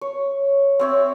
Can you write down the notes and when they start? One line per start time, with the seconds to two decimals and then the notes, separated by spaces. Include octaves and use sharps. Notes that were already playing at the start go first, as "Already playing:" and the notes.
0.01 C#5
0.79 C4 C#5 E5